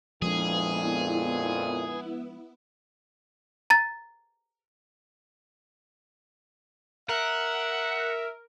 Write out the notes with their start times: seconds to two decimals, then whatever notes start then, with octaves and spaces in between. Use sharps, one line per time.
0.22 F2 A#2 F3 G#3 B3 D4 E4 G#4
3.70 A#5 A6
7.09 A#4 E5 F#5